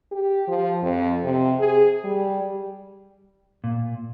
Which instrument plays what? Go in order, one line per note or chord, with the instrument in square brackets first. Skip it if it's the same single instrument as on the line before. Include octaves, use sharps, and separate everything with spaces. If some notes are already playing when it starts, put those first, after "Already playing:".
[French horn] G4
F3
F2
C3
G#4
G3
[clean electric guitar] A#2